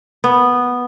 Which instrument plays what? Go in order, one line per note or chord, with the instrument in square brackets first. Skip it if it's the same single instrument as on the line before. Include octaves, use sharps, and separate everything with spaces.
[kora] B3